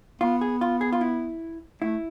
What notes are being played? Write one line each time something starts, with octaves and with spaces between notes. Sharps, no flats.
B3 F4
G#4
F4
G#4
F4
E4
A3 E4